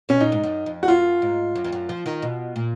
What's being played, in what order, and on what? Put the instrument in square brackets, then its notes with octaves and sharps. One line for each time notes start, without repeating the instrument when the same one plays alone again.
[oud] B2 [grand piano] C#4
[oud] A#2 [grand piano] D#4
[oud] G#2
F#2
F2
[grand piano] F#4
[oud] F#2 [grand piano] F4
[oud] G#2
F#2
F2
F#2
F3
D#3
B2
A#2